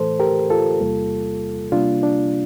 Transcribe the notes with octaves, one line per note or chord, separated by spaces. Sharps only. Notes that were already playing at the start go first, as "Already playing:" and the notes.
Already playing: A2 E3 A3 A4 C5
G4 A#4
F4 A4
E2 C3 G3 A#3
C3 G3 A#3 D4 F4
D4